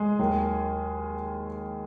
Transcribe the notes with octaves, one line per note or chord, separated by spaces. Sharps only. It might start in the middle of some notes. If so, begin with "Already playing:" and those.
Already playing: G#3 G#4
D#2 D#3 F#3